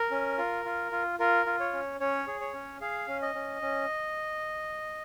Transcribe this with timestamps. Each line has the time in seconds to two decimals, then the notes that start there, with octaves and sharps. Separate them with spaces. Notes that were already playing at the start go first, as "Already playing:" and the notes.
Already playing: A#4
0.11 C#4
0.38 F4
0.65 F4
0.92 F4
1.19 F4 A#4
1.46 F4
1.60 C#5
1.73 C#4
2.00 C#4 C#5
2.27 G#4
2.40 C#5
2.54 C#4
2.81 G#4 F5
3.08 C#4
3.22 D#5
3.35 C#4
3.62 C#4